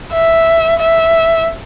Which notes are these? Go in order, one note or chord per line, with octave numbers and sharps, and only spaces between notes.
E5
E5